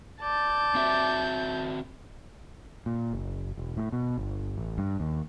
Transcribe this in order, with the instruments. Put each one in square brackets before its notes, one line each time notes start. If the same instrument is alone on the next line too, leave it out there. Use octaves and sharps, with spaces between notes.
[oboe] D5 [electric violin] A5 G6
[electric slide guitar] C4 F#4 E5
[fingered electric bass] A#2
F#1
E1
A2
B2
G1
A1
G2
D#2